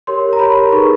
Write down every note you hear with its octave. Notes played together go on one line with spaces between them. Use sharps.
G4 A#4 C#5 C6
A#5
G4 A#4 C#5 B5
D#4 G#4 B4 C#6